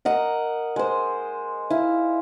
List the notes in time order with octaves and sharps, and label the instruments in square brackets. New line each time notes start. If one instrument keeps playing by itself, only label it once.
[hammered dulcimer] A#4 D#5 F#5
G#3 C5
E4 F5